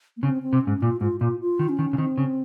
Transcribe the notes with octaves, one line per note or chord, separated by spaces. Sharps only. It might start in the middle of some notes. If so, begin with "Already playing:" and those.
A#3
C#3 C4
C4
C3
C#4
G#2
A#2 F4
G#2 F4
A#2 F4
F4
D#3
C#4
D#3
C#3
D#3 C4
C#3